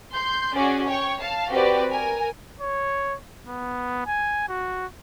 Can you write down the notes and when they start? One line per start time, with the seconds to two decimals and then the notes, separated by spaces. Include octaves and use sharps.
0.13 C6 G6
0.56 C#4 F#4 G#4 D5
0.87 C#5 G5 C#6
1.19 F5 A5
1.50 C4 F#4 G4 B4 D5
1.91 A#4 G#5
2.61 C#5
3.47 B3
4.07 G#5
4.49 F#4